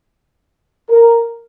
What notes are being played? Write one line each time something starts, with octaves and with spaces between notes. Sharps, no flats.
A#4